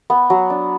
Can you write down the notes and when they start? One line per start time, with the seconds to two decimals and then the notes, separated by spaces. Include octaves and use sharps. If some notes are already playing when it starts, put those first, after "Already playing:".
0.10 B3
0.30 F#3
0.50 D4